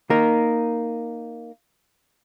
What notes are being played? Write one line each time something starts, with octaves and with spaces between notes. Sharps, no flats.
A#3 D#4 A#4